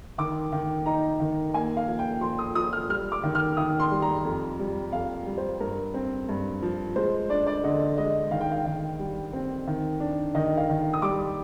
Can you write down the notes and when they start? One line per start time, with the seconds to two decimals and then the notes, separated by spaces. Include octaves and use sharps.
0.18 D#3 D6
0.52 D#3
0.86 D#4 A#5
1.20 D#3
1.54 A#3 G#5
1.77 F5
1.88 F3
1.99 G5
2.21 F3 C6
2.39 D#6
2.55 F3 D#6
2.73 F6
2.89 G3 F6
3.12 D6
3.23 D#3
3.35 F6
3.57 D#3 D#6
3.80 C6
3.91 G3
4.02 A#5
4.25 F2
4.59 G3
4.92 F2 F5
5.26 G3
5.38 C5
5.60 G2 A#4
5.94 C4
6.29 G2
6.62 F3
6.96 G#3 C5
7.30 D4 D5
7.47 D5
7.64 D3 D#5
7.98 G#3 D#5
8.31 D#3 F5
8.41 G5
8.51 F5
8.65 D#3
9.00 G3
9.33 C4
9.67 D#3
10.00 D4
10.35 D#3 D#5
10.57 F5
10.69 D#3
10.94 D#6
11.02 G3 D6